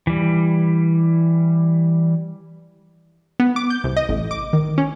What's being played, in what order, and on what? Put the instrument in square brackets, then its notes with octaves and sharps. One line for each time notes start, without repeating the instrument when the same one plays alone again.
[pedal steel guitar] E3 G3
[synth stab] B3
D6
G6
C2
D#5
A1
D6
D#3
C#4